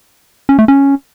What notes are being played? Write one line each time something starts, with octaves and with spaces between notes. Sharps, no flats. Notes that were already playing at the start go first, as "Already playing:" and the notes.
C#4
A3
C#4